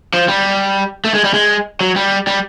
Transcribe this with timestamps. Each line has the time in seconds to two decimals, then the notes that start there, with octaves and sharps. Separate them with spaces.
0.14 F3
0.28 G3
1.05 A3
1.14 G#3
1.24 G3
1.34 G#3
1.81 F#3
1.96 G3
2.27 G3